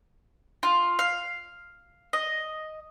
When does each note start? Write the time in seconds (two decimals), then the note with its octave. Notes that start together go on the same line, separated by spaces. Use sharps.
0.63 F4
0.99 F5
2.13 D#5